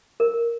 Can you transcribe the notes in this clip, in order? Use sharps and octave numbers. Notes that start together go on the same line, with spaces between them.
A#4